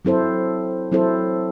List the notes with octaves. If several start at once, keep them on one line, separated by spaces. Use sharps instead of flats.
F#3 C4 E4 A4 C5
F#3 C4 E4 A4 C5